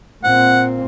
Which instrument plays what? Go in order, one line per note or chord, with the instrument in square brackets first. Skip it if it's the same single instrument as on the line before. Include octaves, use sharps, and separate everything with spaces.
[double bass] A#2 C4 [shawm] F#5